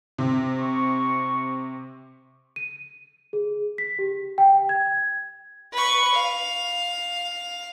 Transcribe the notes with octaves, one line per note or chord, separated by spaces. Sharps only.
C3
C#6
D#7
G#4
B6
G4
G5
G#6
B4 C#6
F5